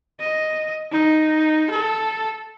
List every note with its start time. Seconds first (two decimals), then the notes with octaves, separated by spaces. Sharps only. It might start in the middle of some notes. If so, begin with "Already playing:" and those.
0.20 D#5
0.92 D#4
1.70 A4